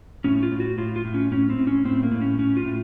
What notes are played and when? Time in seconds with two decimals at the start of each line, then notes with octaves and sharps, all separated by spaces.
0.24 A2 C#4
0.43 F4
0.52 A2
0.60 F#4
0.78 A2 F4
0.96 F4
1.05 A2
1.14 C#4
1.32 A2 C#4
1.50 C4
1.59 A2
1.67 C#4
1.85 A2 C4
2.03 A#3
2.12 A2
2.21 C#4
2.39 A2 C#4
2.57 F4
2.65 A2